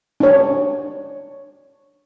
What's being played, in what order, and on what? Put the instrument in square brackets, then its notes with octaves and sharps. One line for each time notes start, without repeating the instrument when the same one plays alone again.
[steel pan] D4 C#5